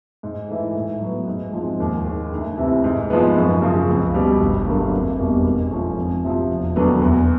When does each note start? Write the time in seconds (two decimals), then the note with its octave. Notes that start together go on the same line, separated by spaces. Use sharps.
0.23 G#2
0.48 E3 A3
0.75 A2
1.01 F#3 B3
1.27 G#2
1.53 F3 G#3 C4
1.80 D#2
2.06 D#3 G#3
2.32 D2
2.58 C3 E3
2.84 G#2
3.10 F3 G#3 B3
3.36 F#2
3.62 C#3 F3
3.89 C#2
4.15 B2 G3
4.40 G1
4.66 G2 D3 F#3 A#3
4.93 F1
5.19 E2 B2 G3 A#3
5.45 G#2
5.71 F3 A3 C#4
5.97 F2
6.24 C3 F3
6.50 E1
6.76 D#2 D3 F#3 B3
7.01 E2